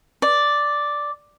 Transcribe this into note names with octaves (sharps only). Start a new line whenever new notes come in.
D5